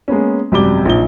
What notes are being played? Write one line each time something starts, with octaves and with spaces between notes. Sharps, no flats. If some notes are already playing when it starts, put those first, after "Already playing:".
G#3 A#3 B3 C#4
G#1 F#2 C3 G3 D6 G7
A#1 A#2 D#4 G7